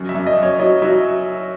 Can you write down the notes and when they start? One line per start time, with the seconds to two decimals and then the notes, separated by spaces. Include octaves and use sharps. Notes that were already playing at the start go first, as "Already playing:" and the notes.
Already playing: F#2
0.09 E5
0.14 F#2
0.27 D#5
0.37 F#2
0.43 C#5
0.60 F#3 D#5
0.82 F#3 E5